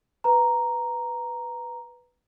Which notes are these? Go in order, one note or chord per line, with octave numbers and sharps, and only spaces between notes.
B4 A#5